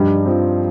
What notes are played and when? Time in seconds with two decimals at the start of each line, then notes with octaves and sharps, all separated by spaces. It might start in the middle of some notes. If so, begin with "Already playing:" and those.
Already playing: G2 F3 G3 D#4 G4
0.26 F3 C4